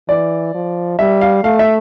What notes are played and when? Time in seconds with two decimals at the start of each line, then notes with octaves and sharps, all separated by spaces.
0.09 E3 D5
0.54 F3
0.99 G3 E5
1.21 F5
1.44 A3 F5
1.59 E5